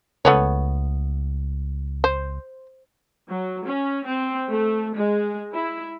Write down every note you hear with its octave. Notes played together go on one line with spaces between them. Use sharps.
C#2 A3 B3 C#5
C5
F#3
C#4
C4
A3
G#3
E4